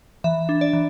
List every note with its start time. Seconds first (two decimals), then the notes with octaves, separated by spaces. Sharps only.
0.24 E3 E5
0.49 D4
0.61 D5
0.73 E3